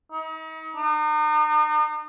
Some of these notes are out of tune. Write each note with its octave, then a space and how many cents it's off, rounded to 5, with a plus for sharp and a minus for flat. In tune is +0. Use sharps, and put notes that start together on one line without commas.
D#4 +40
D#4 -40